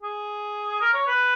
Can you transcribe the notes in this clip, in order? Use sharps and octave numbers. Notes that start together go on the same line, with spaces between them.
G#4
A#4
C#5
B4